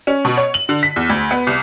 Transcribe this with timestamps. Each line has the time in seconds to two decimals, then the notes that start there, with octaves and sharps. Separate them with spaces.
0.07 C#4
0.25 B2
0.38 C#5
0.54 F#7
0.69 D3
0.83 B6
0.96 E2
1.10 D2
1.31 B3
1.47 C2